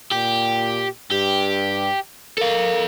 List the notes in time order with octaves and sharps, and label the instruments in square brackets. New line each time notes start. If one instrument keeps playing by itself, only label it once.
[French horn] A#2 [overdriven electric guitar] G4
[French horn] G2 [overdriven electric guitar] G4
[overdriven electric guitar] A4 F5 [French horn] A#4